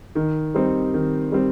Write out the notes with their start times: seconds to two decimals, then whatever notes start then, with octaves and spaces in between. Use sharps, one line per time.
0.15 D#3
0.54 G3 C4 D#4
0.94 D#3
1.32 G3 C4